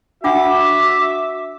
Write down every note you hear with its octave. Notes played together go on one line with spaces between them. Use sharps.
D4 F4 F#4 E5 F#5 D6